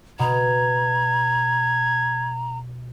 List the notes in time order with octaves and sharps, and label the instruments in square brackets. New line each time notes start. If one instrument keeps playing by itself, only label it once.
[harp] B2 [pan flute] A#5 [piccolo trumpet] G#6